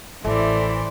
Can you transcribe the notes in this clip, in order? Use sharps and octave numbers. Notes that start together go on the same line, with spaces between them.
A1 E3 A3 C5 D5